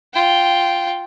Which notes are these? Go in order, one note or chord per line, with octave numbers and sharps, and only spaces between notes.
F4 G5